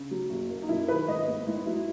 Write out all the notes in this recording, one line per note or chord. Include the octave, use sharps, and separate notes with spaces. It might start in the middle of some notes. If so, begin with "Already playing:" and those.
Already playing: C#3
F#3
F#1
A#3
D#4
F#2 E4
D#3 B4
G#1 D#5
B3
G#2 E4
F#3 E4